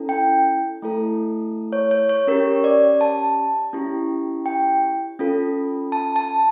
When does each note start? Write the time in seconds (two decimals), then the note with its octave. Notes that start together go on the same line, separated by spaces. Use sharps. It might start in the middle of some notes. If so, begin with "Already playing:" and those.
Already playing: C#4 E4 A4
0.09 G5
0.82 A3 E4 A4
1.73 C#5
1.91 C#5
2.09 C#5
2.27 C#4 G4 A#4
2.64 D5
3.01 A5
3.73 C#4 E4 G4
4.46 G5
5.19 C#4 F4 A4
5.92 A5
6.16 A5